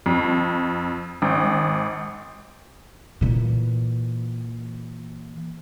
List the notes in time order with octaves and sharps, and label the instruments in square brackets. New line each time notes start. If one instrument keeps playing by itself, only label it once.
[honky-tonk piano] F2
G#1
[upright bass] A#2 E3